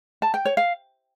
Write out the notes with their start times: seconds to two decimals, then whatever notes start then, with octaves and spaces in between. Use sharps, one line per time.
0.22 A5
0.34 G5
0.45 C#5
0.57 F5